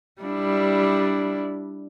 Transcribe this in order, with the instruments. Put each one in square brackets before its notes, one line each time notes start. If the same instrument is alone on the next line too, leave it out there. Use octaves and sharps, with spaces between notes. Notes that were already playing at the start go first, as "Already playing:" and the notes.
[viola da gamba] G3 D4 E4